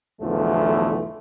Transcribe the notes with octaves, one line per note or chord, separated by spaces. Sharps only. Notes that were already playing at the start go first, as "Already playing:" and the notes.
B1 E2 D3 E3 F3 A3